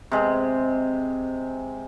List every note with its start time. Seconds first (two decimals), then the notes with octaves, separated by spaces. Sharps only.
0.12 C3 G#3